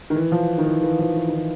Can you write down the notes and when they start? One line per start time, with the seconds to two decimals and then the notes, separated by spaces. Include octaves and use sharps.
0.10 D#3
0.16 E3
0.32 F3
0.58 D#3
0.65 E3
0.83 E3
0.99 F3
1.17 E3
1.28 D#3
1.33 E3